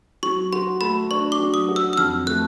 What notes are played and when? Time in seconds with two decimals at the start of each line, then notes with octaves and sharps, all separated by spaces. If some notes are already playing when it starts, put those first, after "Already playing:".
0.23 F#3 C#6
0.53 F#4 C6
0.81 A3 B5
1.11 D4 C#6
1.32 D6
1.40 F#3
1.54 D#6
1.69 F#4
1.76 E6
1.93 E6
1.97 F2 F6
2.27 A3 F#6